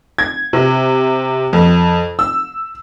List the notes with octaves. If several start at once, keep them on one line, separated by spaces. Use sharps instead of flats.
G#6
C3
F2
E6